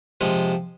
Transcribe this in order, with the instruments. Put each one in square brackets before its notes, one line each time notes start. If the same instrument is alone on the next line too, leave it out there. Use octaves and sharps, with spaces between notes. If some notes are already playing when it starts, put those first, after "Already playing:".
[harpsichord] C3 F3 G#3